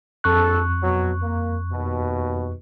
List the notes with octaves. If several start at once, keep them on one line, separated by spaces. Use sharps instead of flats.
A#1 F2 A4 C#6 F#6
B2 F#3
A#3
D#2 B2